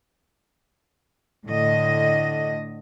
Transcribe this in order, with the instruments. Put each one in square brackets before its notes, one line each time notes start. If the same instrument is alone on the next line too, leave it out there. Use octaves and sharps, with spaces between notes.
[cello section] A2 D3 D#5